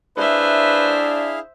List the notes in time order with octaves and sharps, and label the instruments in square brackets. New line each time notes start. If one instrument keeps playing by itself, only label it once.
[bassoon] D4 [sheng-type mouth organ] E4 G#4 F5 [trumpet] B4 [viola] C5 E5